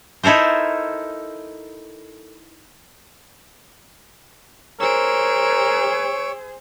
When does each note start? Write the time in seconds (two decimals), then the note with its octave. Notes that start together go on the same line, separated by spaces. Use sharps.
0.23 D#4 E4 A4 A#4 C5
4.80 G#4 A#4 C5 C#5 E6 D7